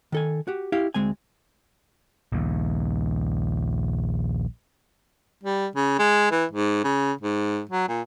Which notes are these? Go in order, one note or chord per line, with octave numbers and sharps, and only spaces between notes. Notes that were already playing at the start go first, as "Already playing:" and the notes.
D#3 A4 G#5
F#4 G4
E4 G4 F5
D2 G#3 C4 G#5
A#1 D#2
G3
C#3
G#3
E3
G#2
C#3
G#2
F#3
A#2